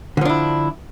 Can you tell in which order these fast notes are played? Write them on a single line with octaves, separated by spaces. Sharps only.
D3 F3 D4 E4